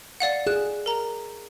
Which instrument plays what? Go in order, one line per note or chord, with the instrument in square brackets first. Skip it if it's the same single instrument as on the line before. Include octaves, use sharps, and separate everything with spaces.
[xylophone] D5 F5 F#5
[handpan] G#4 [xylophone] F#6 E7
[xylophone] A#4 A#5